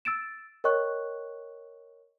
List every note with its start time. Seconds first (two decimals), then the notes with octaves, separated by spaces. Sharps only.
0.05 E6 A6 D7 E7
0.64 A#4 C#5 D#5 G5 C#6 F#6